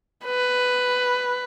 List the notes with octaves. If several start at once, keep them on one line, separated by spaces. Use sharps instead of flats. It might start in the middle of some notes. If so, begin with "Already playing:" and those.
B4